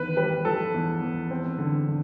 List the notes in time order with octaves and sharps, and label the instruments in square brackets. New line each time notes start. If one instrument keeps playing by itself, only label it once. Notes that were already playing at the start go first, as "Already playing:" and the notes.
Already playing: [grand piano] E2 D#3 [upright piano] B4
[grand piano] G3 [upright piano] B4
[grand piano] F3 [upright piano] A4
[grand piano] E2
E2
C4
D3
D3